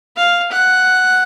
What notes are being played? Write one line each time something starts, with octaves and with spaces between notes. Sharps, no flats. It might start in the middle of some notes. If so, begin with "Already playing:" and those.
F5
F#5